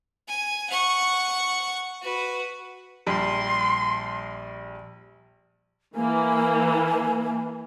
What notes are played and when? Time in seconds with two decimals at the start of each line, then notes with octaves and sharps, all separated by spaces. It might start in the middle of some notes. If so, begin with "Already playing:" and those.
0.28 G#5
0.70 F#5 C#6
2.01 F#4 B4
3.07 A#1 G3 C6
5.95 E3 A#3 G#5